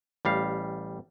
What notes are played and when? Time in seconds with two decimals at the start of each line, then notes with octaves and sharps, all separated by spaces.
0.25 A1 G3 F5